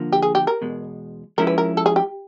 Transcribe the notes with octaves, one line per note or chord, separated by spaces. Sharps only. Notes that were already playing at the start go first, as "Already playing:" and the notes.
Already playing: D3 F3 A#3
G4
G#4
G4
A#4
E2 B2 G#3
F3 G#3 C#4 E4 A#4
B4
A#4
A4
G#4
G4